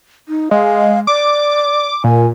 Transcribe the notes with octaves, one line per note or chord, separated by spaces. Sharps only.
D#4
G#3 F5
D5 D6
A#2 G#5